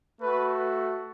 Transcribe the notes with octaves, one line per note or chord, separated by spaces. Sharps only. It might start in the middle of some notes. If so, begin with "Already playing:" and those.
A3 F#4 B4